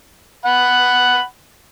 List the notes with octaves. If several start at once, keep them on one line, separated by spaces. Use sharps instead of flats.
F#5 B5